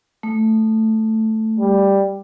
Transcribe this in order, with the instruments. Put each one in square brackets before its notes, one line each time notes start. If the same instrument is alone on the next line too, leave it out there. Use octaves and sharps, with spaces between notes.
[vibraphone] A3
[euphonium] G3